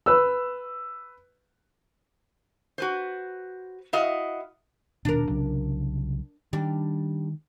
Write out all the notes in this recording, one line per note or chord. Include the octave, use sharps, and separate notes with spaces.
B4 E6
F#4 B4 C5
E4 F#4 D#5 F5
D#1 B2 D#3 D4 A#4
C2 C#3 F#3
D#3 G3 D4